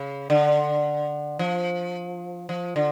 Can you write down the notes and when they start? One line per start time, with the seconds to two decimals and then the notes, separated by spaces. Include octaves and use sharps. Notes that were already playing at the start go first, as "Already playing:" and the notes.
Already playing: C#3
0.30 D3
1.39 F3
2.49 F3
2.76 D3